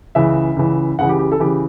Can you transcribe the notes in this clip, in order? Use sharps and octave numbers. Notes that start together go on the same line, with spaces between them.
C#2 C#3 E3 E5
C#2 C#3 E3
C#2 C#3 E3 F#5
G4
G4
A4
C#3 E3 G4